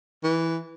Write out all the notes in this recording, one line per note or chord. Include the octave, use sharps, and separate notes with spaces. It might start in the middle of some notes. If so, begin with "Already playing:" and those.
E3